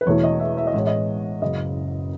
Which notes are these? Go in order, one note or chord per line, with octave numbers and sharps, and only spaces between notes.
B4
E1 E2 B2 A3 E4 C#5
D#5
E5
E5
D#5
A1 A2 G#3 C#5
D#5
F#1 F#2 C#3 D#5